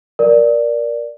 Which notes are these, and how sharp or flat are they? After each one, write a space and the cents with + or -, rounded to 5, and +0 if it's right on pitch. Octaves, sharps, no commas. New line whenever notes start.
A#4 +15 D5 +0